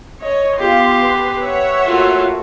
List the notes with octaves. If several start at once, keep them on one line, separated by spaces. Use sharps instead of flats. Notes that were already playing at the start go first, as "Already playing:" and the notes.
C#5 D#5
B3 F4 G4 F5 C6
B4
C#5 E5 F#5
A3 A#3 F4 F#4